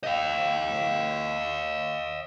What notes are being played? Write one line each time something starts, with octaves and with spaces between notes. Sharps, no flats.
D#5 F5